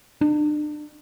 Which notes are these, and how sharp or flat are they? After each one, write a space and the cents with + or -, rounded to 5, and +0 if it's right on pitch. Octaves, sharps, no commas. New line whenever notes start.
D4 +35